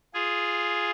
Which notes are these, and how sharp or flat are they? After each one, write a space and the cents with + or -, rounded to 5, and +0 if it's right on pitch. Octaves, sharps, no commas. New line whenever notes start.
F4 +0 G#4 +0